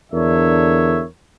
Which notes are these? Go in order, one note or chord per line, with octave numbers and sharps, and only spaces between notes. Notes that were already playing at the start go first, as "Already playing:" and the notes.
E2 D3 D4 A#4 C#5 E5